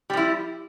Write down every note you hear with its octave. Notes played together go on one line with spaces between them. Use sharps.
F3 G3 E4